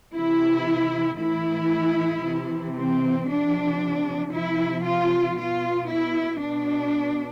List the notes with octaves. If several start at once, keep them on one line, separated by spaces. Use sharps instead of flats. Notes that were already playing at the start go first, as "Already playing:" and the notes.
C3 E3 E4
A2 E3 E4
C3 E3
C4
C3 F3 D4
C3 F3 E4
F4
B2 F4
E4
B2 D4